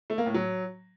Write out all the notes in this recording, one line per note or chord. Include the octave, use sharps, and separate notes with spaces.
A3
A#3
A2
F#3